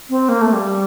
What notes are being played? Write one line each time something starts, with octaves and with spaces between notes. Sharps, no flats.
C4
A#3
A3
G3